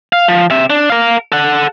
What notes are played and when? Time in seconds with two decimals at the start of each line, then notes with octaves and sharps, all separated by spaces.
0.13 F5
0.28 F3
0.50 C3 E5
0.70 D4
0.90 A#4 F5
1.32 A4 F#5